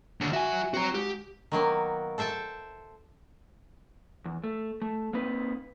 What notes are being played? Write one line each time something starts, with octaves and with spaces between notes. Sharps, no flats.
D#2 D3
F#3 F#4 E5 G#5
C4 F#4 A#5
G#2 G4
D#3 F#3 A#3 B3
A4 C5 E5 G5 A5
E2
A3
A3
A#3 C4 D#4 B4